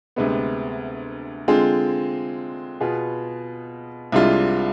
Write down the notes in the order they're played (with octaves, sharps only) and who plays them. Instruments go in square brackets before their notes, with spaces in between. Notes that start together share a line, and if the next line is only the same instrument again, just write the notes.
[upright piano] D2 C3 G#3 B3
D3 G#3 C4 F4 G#4
B2 B3 F4 G#4
C2 C3 G#3 D4 F4